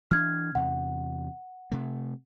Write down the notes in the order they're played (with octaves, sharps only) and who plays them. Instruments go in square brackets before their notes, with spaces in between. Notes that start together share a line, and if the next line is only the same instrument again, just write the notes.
[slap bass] E3 C#4 D4 [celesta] F6 G#6
[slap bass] E2 C3 [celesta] F#5
[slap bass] C3 A3